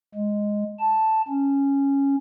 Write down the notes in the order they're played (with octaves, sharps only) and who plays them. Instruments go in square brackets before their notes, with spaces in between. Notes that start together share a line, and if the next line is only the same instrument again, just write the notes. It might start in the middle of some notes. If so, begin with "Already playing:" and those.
[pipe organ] G#3
A5
C#4